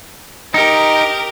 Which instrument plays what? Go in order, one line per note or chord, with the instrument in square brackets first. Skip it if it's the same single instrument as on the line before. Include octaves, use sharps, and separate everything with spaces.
[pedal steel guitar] D#4 [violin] G4 A#4